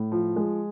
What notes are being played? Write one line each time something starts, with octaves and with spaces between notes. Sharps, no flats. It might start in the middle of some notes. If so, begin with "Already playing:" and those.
Already playing: A2
F3
G#3